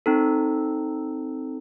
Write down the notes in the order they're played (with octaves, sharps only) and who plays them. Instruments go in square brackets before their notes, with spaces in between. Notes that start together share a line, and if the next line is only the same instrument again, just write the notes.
[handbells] C4 D#4 A4